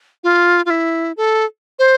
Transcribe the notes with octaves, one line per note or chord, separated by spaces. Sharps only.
F4
F4
E4
A4
C5